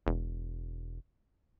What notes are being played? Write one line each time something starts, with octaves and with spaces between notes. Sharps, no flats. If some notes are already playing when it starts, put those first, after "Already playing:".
E1